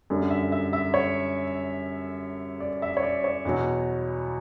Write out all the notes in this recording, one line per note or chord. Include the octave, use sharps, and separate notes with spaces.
F#2 D3 G3
E5
E5
E5
C#5
D5
E5
C#5
D5
C#5
E2 B2 F#3